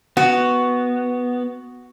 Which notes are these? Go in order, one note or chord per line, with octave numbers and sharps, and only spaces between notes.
B3 F#4